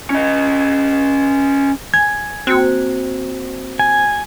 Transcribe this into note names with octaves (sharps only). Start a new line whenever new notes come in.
C#4 D#5
G#5 G#6
A#3 C4 F#4
G#5